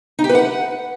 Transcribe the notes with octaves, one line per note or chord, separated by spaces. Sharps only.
D#4
G4
B4
F#5